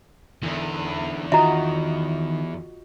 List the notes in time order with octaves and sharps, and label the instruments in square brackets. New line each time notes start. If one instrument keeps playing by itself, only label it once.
[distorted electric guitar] E2 [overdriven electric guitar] D3 E3
[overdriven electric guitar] D#3 [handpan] F4 F#4 D#5 [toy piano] E5 A#5